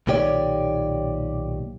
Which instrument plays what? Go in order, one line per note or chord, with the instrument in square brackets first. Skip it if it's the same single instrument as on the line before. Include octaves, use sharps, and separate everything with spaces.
[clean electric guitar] B1 A#2 D#3 G4 C#5 D5